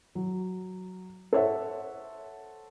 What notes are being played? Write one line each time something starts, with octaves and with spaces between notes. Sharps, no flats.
F#3
A4 C5 C#5 E5 F#5